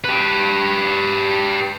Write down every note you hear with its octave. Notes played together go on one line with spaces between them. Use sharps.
G4 B4